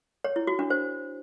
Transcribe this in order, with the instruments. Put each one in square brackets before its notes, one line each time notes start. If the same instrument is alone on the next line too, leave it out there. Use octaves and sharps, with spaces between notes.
[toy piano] C#5
E4
F#4
D4
C5